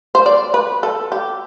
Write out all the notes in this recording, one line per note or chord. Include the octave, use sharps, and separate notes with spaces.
C5
D5
B4
A4
G4